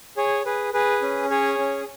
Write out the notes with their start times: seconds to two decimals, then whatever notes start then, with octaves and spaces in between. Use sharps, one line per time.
0.17 G#4 C#5
0.46 G#4 B4
0.74 G#4 B4
1.02 C#4
1.30 G#4 C#5
1.59 C#4